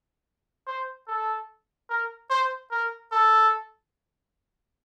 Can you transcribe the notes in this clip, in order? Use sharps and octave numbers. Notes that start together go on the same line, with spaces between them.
C5
A4
A#4
C5
A#4
A4